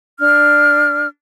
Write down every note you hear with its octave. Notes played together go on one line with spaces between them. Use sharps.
D4 F6